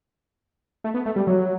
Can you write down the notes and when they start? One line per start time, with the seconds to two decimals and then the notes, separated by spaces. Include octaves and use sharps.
0.84 A3
0.94 B3
1.06 A3
1.16 G3
1.27 F#3